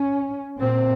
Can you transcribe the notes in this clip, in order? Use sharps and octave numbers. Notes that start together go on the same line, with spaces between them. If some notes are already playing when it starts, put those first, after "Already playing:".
Already playing: C#4
A#2 C4